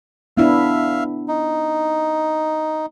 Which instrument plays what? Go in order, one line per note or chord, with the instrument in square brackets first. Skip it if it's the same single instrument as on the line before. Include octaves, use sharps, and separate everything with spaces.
[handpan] B3 D4 E4 [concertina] E5 F5
[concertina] D#4